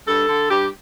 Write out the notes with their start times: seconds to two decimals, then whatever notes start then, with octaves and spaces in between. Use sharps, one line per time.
0.06 G2 A4
0.29 D3
0.49 G2 G4